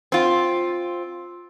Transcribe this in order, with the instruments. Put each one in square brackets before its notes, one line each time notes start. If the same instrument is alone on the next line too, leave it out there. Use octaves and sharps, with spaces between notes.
[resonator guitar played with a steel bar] C4 F4